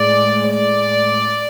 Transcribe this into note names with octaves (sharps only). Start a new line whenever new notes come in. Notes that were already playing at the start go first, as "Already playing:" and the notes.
Already playing: A2 G#3 D5
D5